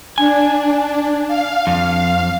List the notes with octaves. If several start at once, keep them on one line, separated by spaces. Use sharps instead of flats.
D4 G#5
F5
F2